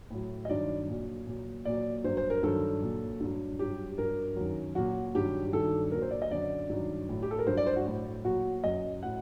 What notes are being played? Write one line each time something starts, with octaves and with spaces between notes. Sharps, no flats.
A2 F#3
D#5
G2 D#3 F#3 D5
A#2 F#3
A#2 F#3
A#2 F#3 D5
G2 F#3 C5
C5
A#4
G2 D#3 F#3 A4
A#2 F#3
G2 F#3
G2 F#3 G4
G2 F#3 A#4
F#2 D#3 F#3
A#2 F#3 F#4
G2 D#3 F#3 G4
G2 D#3 F#3 A4
A#2 F#3 A#4
C5
D5
D#5
F#2 D3 F#3 D5
G2 D#3 F#3
A2 F#3
G4
A4
A#4
G2 F#3 C5
D5
C5
F#4
A2 F#3
A#2 F#3 F#4
F#2 F#3 D#5
A2 F#3 F#5